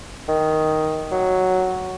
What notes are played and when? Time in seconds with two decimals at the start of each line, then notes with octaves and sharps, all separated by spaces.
0.28 D#3
1.11 F#3